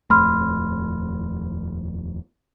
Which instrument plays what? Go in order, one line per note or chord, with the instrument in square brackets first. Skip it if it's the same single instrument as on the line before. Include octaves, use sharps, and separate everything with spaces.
[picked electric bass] D#1 F2 A3 [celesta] B5 C6 F6